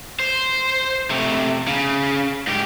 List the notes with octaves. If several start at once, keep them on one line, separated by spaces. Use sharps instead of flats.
C5
C3 A3
C#3
G#2 G4